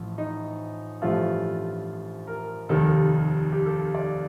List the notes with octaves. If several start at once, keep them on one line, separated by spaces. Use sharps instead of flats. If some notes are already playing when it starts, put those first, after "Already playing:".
Already playing: A1 A2 F3
D#4
A1 G2 F3 A3 F4
A#4
F1 D#2 D#3 G3 A4
G4
A4
D5